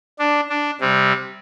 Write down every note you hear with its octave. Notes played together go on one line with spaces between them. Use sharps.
D4
D4
C3 G3 C4